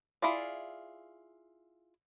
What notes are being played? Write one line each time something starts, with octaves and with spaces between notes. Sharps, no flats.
E4 F4 G#4 D5